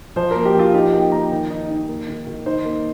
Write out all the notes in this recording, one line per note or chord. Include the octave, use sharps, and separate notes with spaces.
F3 C5
A#3 A#4
G4
F3 F4
D#4 G4
A#3 G5
A#3 A#5
D#3
D#4
D#4
A#3
D#3
D#3
D#4 C5
A#3